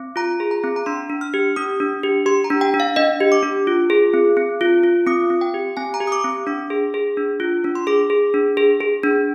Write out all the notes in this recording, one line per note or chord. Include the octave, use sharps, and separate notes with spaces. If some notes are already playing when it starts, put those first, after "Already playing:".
Already playing: C4
F4 A#5
G#4
A#5
C4
A#5
D4 C6
D4
F6
G4
D4 D#6
D4
G4
G4 C6
A#5
D4
G5
D4
F5
D4 D#5
G4
D6
D4
F4
G#4
C4
C4
F4
F4
C4 D#6
C4
G5
G4
C4 G#5
A#5
G4
D#6
D6
C4 D#6
D4 D6
G#4
G#4
D4
F4
D4
C6
G#4 D6
G#4
D4
G#4
G#4
D4